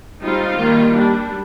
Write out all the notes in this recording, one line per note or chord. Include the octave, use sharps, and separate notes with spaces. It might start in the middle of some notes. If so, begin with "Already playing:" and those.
G3 C4 D#4 F4
D#3 G3 A#3
G3 D4